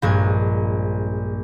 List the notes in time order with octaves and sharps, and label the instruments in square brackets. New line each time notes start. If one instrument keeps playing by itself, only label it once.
[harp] A#1 G2 G#3 G#6